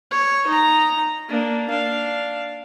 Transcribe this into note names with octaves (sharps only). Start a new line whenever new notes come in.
C#5
D#4 A#5
A#3 D4
D4 F5